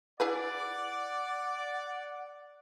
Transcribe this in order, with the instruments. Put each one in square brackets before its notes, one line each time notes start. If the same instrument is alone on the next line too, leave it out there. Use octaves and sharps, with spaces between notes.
[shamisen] E4 G#4 B4 [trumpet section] D5 [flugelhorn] F#5